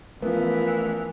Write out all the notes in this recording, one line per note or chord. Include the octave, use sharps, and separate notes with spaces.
E3 F3 A3 B3 C#4 A#4